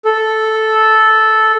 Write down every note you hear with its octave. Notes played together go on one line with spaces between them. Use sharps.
A4